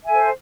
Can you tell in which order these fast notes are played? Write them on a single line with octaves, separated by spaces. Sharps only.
E5 G#5 A4 C5